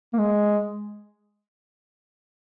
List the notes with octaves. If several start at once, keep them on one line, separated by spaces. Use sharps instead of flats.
A#3
G#3